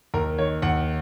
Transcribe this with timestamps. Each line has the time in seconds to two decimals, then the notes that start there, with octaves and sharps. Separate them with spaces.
0.14 D#2 A#4
0.38 D#3 C#5
0.62 D#2 F#5